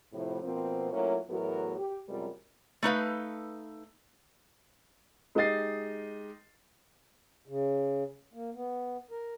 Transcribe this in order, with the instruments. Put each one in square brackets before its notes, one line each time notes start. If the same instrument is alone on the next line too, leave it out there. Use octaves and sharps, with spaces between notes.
[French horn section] A2 C3 F3
B2 F3 A#3 C4
F#3 A3 A#3 C#4 E4 F4
E2 A2 F#3 B3 F#4 A#4
G4
F#2 C3 G3 G#3 F4 A#4
[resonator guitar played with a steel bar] A3 D#4 B4 F5
[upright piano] G#3 D#4 G4 D#5 A6 C7
[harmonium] C#3
A#3
B3
A#4